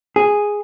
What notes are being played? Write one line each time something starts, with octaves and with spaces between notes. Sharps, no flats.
G#4